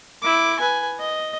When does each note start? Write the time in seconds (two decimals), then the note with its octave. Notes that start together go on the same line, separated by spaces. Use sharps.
0.22 E4 D6
0.59 B4 G#5
1.00 D#5